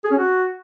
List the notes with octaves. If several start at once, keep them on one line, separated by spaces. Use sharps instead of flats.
G#4
C#4
F#4